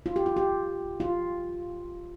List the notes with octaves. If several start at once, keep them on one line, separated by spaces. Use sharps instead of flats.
F4
G4
F4
G4
F4